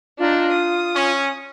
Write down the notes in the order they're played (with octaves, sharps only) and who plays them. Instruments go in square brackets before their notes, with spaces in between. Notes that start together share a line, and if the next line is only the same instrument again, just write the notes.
[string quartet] D4 D#4 [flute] F4
[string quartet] D#6
[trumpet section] C#4